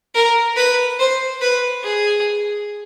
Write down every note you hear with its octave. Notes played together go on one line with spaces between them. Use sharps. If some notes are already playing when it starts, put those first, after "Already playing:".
A#4
B4
C5
B4
G#4